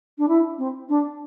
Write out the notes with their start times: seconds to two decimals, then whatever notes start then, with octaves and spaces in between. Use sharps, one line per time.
0.18 D4
0.28 E4
0.58 C4
0.89 D4